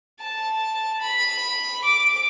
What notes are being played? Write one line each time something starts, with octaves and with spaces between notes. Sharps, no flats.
A5
B5
D6